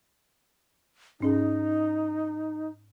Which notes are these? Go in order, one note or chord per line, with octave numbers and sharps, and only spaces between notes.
G#2 C#4 D#4 G#4